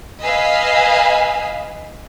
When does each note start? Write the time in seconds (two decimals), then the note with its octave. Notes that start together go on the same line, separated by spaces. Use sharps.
0.22 B4 D#5 F5 G#5 E6 B6